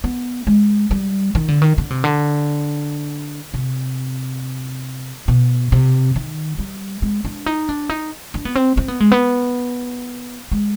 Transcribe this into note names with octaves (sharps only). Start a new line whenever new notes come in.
B3
G#3
G3
D#3
D3
D#3
D3
C3
D3
C3
B2
C3
D#3
G3
G#3
D4
D#4
D4
D#4
D4
B3
C4
C4
B3
G#3
B3
G#3